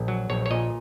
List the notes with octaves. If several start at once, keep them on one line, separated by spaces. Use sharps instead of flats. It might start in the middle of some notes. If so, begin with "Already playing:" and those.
Already playing: A#1
F#3
A#1 C#5
C#5
A#2 D#5